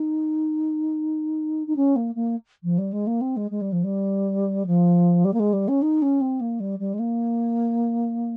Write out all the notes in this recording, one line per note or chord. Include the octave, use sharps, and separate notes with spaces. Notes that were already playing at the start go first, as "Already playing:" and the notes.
Already playing: D#4
D#4
C#4
A#3
A#3
F3
G3
G#3
A#3
C4
G#3
G#3
G3
F3
G3
F3
G3
A#3
G#3
G3
C#4
D#4
C#4
C4
A#3
G3
G3
G#3
A#3